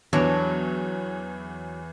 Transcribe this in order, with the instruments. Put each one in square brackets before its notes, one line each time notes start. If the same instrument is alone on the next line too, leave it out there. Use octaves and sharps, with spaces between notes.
[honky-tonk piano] E2 E3 [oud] F#3 D4